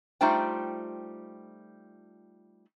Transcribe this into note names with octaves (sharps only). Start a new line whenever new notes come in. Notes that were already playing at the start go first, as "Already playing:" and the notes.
G3 A3 D#4 F4 C5 G5